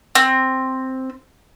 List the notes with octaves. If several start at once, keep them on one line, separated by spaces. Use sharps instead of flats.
C4